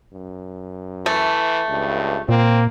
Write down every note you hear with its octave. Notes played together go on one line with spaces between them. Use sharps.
F#2
E3 A3
C#2 G2
A#2 A#3 C4